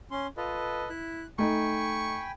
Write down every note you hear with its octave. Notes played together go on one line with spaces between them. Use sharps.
C#4 C6
F4 A4 B4 D#5
E4 F#6
A3 D#4 G5 G#5 B5 C#6